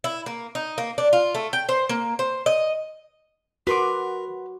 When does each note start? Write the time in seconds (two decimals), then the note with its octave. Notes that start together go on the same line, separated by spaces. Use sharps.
0.04 E4
0.26 A#3
0.55 D#4
0.78 A#3
0.98 D4
1.13 F4
1.35 A3
1.53 G5
1.69 C5
1.89 A#3
2.19 C5
2.46 D#5
3.67 F#4 A#4 B4 C6 D6